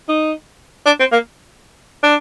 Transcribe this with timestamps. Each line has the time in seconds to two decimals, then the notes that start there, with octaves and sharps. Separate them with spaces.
0.09 D#4
0.86 D4
1.00 C4
1.12 A#3
2.03 D4